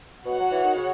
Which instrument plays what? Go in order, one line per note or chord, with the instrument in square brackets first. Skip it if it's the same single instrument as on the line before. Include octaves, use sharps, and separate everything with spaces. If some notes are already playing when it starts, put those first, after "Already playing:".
[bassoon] B2 [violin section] F#4 C#5 F#5
[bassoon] F#3
E3
D#3
C#3